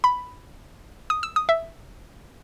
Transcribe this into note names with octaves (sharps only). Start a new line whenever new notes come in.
B5
D#6
E6
D#6
E5